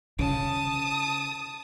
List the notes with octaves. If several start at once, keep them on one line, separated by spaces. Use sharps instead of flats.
C#3 A5 D#6